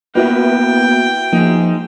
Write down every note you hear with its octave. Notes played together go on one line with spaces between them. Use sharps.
A#3 B3 E4 F#4 B4 G5
F3 A#3 D#4 G#4